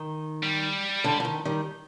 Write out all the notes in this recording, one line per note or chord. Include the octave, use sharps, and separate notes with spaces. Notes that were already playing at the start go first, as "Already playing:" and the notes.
Already playing: D#3
G3
D3
D3
D#3
D#3 G3